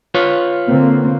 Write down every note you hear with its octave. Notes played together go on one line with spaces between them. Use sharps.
F4 B4 C#5
D3 A#3 C4